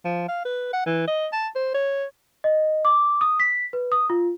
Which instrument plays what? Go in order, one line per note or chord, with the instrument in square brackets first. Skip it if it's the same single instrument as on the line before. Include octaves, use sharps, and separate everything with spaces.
[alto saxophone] F3
F5
B4
F#5
E3
D#5
A5
C5
C#5
[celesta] D#5
D6
D#6
B6
B4
D#6
F4